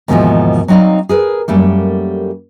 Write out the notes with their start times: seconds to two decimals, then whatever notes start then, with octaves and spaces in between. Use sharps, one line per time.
0.08 D#2 G#2 B2 D3 E3 F3
0.68 F#3 C4 D#4 D5 F5
1.09 G#4 A#4 B4
1.48 F#2 G3 A3 A#3